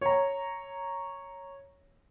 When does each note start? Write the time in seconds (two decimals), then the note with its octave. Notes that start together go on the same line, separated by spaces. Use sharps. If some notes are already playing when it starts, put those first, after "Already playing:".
0.01 C#5 A#5